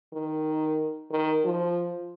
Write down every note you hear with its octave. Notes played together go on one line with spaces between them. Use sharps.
D#3
D#3
F3